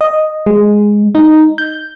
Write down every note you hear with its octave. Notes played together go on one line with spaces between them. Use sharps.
D#5
G#3
D#4
G6